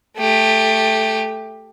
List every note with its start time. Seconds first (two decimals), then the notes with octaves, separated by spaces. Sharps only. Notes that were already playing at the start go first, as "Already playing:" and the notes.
0.17 A3 G4